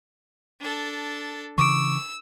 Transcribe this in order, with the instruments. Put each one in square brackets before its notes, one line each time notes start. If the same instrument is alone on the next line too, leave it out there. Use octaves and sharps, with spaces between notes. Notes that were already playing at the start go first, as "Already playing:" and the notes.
[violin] D4 A4
[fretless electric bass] C#3 E3 [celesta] C#6 D6 D7 [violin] E6